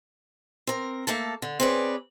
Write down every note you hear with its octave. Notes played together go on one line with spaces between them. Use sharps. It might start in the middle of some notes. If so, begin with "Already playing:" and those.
C4 A#4
A3 A#3 A4 A5
D3
C4 G#4 B4 C#5 D5